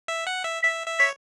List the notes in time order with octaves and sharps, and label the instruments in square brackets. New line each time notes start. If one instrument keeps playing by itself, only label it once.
[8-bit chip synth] E5
F#5
E5
[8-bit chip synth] E5 [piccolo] B6
[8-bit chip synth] E5
[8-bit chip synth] C#5 [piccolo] B6